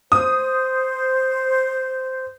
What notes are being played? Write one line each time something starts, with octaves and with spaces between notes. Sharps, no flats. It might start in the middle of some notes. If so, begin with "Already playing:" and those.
C5 D#6